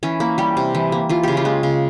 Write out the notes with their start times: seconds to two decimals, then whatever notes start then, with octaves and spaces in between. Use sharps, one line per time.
0.03 E3 C#4
0.20 A#3 E4
0.38 G3 G4
0.57 C3
0.75 E3
0.92 A#3
1.09 E3 F4
1.23 C#3 G4
1.37 F4
1.45 G#3
1.63 C#3